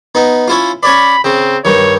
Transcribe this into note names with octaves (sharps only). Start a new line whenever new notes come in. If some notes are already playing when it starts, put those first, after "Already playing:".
B3 D#4
C#4 E4 F4
C#4 C#5 D5 B5
C#3 C4
G2 D#3 C#5